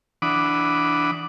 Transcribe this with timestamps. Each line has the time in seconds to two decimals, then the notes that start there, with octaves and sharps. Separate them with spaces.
0.22 E3 D4 F#5 B5 D6 D#6